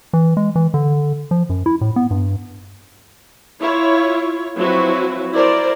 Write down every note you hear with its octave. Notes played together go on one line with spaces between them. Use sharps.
E3
G#3
E3
D3
F3
F#2
E4
A2
B3
G2
E4 F4 C#5
F3 F#3 C4 E4 F#4 B4
E4 A#4 C5 D5